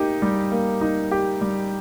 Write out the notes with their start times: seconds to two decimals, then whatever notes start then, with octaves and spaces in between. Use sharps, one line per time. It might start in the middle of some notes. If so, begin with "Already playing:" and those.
Already playing: A#3 D#4 G4
0.22 G3
0.52 A#3
0.81 D#4
1.12 G4
1.41 G3